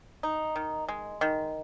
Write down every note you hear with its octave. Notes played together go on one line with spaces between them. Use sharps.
D#4
D#3
G#3
D#3